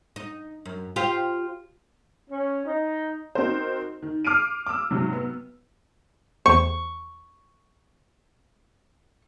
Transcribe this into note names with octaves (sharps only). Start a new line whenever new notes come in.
D#4
F#2
F4 G4 C5
C#4
D#4
C4 D#4 F#4 A#4 C5
D#3
D6 F6 C7 D7 D#7
D6 E6
G#2 C3 F#3
B3
E2 A3 C5 C#6